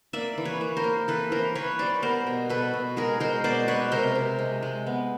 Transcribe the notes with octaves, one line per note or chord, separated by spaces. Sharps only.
A#3 D5 E5
E3
B4 C#5
A#3
A#4 C5
A#3
E3 A4 B4
E3 A#4 C5
E3 B4 C#5
G3 C5 D5
B3 A#4 C5
B2
B2 A4 B4
B2
G#3 G#4 A#4
G#3 A#4 C5
B2 C5 D5
G#3 B4 C#5
C3 A#4 C5
C3
G#3
G#3
B3